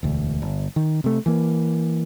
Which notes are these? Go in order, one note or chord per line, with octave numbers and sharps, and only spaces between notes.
E1 D2
G1
D#3
C3 A3
E3 A#3